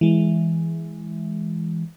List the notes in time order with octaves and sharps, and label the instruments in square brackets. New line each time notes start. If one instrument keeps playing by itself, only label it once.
[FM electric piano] E3 G#3